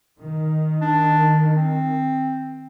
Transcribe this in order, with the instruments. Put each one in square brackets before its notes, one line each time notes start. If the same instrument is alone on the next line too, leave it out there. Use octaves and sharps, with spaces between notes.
[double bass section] D#3
[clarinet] D4
C4